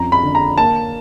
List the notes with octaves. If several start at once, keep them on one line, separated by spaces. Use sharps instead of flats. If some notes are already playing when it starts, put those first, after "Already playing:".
Already playing: F2 C#4 A#5
B5
D3
A#5
A#3 A5